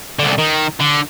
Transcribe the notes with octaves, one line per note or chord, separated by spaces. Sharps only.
C2 D3
D#3
D3